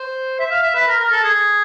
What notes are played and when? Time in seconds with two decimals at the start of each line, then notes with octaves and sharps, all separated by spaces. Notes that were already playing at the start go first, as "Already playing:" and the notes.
Already playing: C5
0.39 E5
0.51 F5
0.63 E5
0.75 B4
0.87 A#4
0.99 A#4
1.12 A4
1.24 G#4